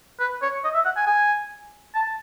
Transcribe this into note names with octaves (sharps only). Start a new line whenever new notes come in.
B4
C#5
D#5
E5
F#5
G#5
G#5
A5